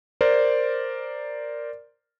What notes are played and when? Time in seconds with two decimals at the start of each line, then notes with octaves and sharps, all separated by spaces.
0.21 A#4 C5 D5